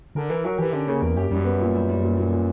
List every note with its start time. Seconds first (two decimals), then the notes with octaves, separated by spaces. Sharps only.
0.15 D3 A#4
0.30 E3 A#4
0.44 F#3 A#4
0.58 E3 G4
0.72 D3 C#4
0.87 C#3 A#3
1.01 E2 A#4
1.16 F#2 G4
1.30 F#2 G3
1.45 B3
1.60 A#2
1.74 G3
1.89 G3
2.02 A#2
2.17 A#2
2.31 A#2